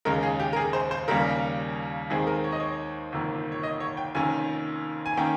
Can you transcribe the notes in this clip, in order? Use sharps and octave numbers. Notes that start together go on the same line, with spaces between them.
D#2 C#3 G#3 C#4 A#4
G#4
G4
A#4
G#4
C5
C5
D#2 C#3 G3 A#3 C#4 A#4
D#2 D#3 G#3 C4 G#4
A#4
C#5
D#5
C#5
G1 F2 C3 D#3 A#3
C#5
D#5
C#5
G5
F1 F2 D#3 A#3 C#4 G#5
G#5
D#3 A#3 C#4 G5